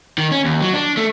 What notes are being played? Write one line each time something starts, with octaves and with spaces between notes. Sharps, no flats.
D#3
C#4
D#2
F#3
D4
A3